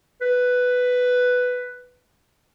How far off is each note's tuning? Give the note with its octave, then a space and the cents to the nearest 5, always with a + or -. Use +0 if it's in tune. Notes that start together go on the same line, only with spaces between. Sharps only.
B4 +5